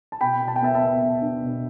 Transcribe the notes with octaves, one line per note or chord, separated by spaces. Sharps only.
A5
B2 G5 B5
B2
A5
G5
B3 E5 A5
E5 A5
B3
B3
D4
B2